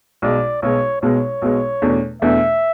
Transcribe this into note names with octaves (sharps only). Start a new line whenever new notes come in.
B1 B2 G#3 D5
B1 B2 G#3 C#5
B1 B2 G#3 C#5
B1 B2 G#3
E2 B2 A3 D4
E2 B2 A3 D4 E5